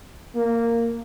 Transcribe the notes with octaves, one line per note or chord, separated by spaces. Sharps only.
A#3